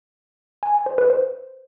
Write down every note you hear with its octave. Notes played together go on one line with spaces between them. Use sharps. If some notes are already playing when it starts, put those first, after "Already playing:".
G#5
G#5
C5
B4
C5